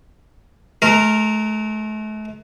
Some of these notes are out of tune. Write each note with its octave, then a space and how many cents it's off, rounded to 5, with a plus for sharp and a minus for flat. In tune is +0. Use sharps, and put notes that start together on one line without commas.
A3 -40 A#4 -10